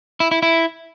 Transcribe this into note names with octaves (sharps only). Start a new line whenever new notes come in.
E4
E4
E4